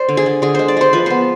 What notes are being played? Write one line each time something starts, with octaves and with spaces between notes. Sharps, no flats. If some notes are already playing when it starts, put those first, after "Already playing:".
Already playing: C5 D5
D3
G#4
D3
D3 G#4
G#3 C5
D5
G#3 C5
F3 B4
B3 C5